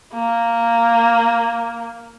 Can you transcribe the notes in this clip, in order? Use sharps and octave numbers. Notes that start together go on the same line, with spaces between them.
A#3